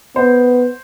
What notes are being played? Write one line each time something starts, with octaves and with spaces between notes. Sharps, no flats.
B3 C5